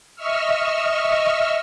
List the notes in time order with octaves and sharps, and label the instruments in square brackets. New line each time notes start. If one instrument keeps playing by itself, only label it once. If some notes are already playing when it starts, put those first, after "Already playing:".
[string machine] D#5 E5 C#6 E6 F6